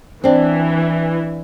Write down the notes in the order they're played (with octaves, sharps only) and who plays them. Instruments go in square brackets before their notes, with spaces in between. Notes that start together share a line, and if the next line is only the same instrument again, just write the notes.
[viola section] E3 [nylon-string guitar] C4 D4